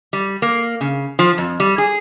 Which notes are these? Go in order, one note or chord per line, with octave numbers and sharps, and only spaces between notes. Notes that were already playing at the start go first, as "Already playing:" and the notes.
G3
A#3
C#3
F3
F2
G3
G#4